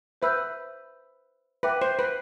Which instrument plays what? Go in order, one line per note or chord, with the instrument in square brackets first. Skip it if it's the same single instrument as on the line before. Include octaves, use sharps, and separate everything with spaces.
[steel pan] B4 [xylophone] C5 E5 B5 E6 G6
[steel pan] B4 [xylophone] E5 G5 D6
[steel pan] C5
B4